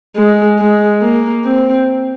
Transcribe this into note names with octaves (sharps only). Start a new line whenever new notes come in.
G#3
G#3
A#3
C4